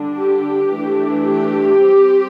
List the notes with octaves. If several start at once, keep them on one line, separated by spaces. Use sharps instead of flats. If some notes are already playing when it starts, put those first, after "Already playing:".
Already playing: D3 G3 D4
G4
E3 A3 D4
G4
G3 C4